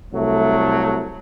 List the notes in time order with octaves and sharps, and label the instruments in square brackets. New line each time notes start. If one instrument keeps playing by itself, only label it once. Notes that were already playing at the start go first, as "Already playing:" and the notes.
[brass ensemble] C2 F#3 A3